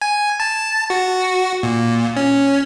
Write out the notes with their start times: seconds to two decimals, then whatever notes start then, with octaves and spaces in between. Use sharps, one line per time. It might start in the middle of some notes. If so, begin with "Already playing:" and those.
0.02 G#5
0.40 A5
0.90 F#4
1.63 A#2
2.17 C#4